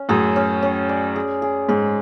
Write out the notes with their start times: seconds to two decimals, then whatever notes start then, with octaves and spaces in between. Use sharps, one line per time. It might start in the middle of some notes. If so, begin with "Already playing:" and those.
Already playing: C#4
0.09 F#2 A2 G#4
0.36 C#4
0.63 C#4
0.89 D5
1.16 G#4
1.42 G#4
1.69 G#2 G#4